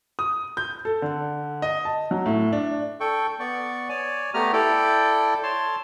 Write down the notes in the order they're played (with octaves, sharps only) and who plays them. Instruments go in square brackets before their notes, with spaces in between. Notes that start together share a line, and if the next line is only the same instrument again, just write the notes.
[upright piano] D#6
G6
A4
D3
D#5
A5
F#3
A2
D4
[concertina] A4 G5 C#6
B3 D5 C#6
C#5 D5 G#5
A3 B3 G4 A#5 F6
E4 A4 D5 G5
C#5 A5 C6